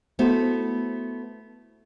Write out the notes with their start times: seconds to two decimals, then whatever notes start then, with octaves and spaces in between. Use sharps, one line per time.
0.19 A3 B3 E4 F#4 C5